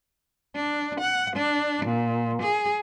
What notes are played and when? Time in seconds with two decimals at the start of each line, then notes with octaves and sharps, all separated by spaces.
0.55 D4
1.00 F#5
1.36 D4
1.85 A#2
2.42 G#4